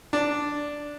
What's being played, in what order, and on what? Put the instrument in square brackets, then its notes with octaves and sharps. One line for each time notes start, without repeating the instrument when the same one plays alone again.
[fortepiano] D4